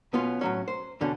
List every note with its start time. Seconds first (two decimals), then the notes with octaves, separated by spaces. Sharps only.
0.13 B1 B2 B3 C#4 F4 C6
0.41 A2 F#3 C#4
0.68 C5
1.01 E2 B2 D3 C#4